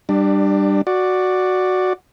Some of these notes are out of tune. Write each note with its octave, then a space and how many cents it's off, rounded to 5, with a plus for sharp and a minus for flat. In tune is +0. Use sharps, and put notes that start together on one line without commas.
G3 +0 D4 +25
F#4 +0 D5 +5